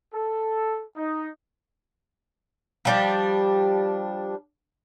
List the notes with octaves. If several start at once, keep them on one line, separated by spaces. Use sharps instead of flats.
A4
D#4
F3 G3 D4